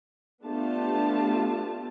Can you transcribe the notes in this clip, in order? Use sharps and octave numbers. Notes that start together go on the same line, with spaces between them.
A3 B3 D4 F4 G4 A5